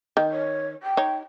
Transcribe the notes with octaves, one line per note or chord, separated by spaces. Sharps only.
D#3
C#5
G5
D#4 C#5